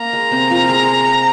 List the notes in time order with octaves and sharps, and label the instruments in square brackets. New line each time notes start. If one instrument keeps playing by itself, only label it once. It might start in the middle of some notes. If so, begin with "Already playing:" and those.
Already playing: [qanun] A#3 [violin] A#5
[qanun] G#3
C3 C4
F3 F4
G#3 G#4